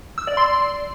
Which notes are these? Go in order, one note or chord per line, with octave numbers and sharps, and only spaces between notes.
E6
D5
C6